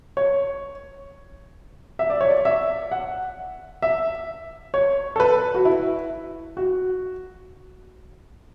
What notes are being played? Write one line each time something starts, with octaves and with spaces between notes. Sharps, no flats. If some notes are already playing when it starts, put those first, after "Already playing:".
C#5
E5
D5
C#5
D5
E5
F#5
E5
C#5
A4
B4
F#4
E4
F#4